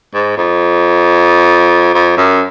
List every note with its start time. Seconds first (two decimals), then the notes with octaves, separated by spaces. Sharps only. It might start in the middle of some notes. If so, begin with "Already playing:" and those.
0.14 G#2
0.37 F2
1.94 F2
2.17 F#2